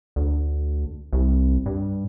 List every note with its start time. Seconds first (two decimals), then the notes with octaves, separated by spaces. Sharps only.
0.16 D2
1.13 C2
1.66 G2